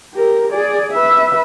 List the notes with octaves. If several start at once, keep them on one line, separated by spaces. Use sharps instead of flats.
G4 A#4
G#4 D5
B4 E5